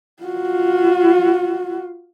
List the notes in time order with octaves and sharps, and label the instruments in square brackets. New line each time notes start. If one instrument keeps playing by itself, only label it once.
[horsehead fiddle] F4 F#4